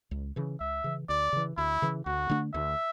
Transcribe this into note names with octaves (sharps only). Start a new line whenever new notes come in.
C#2
C#3 E3
C#2 E5
C#3 E3
D2 D5
C#3 E3
D2 E4
C#3 E3
D2 F#4
D3 A3 D4
D2 E5